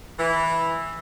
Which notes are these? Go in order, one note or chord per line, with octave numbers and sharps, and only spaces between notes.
E3